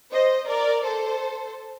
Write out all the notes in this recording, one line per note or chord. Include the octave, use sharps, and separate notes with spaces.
C5 D#5
A#4 D5
A4 C5